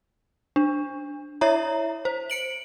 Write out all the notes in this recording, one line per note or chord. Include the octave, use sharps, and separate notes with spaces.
D4
E4 C#5 E5 A#5
C5
C#7 D7 F#7